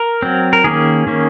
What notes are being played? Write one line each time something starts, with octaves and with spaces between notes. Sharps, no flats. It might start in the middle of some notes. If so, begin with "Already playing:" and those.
Already playing: A#4
F#3 C4
A#4
D#3 A#3 C#4 G#4
D#3 A#3 C#4